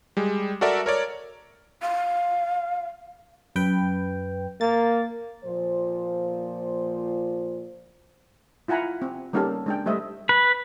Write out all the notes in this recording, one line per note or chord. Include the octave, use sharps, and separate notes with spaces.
G3 G#3
F#4 A4 A#4 D5 E5
A#4 C#5 D5
F5
F#2 B4 G5
A#3 A6
A#2 F3 C5
E4 F4 F#5 G#5 A#5 B5
C4
G3 A#3 C#4 D#4 G4 A4
G#3 D4 G5
G3 A3 C5 D#5 E5
B4